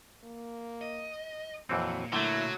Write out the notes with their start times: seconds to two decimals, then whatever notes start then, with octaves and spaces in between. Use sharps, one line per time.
0.24 A#3
0.81 D#5
1.69 F2 A#2 E3 F#3 C4
2.12 D3 F#3 A3 E4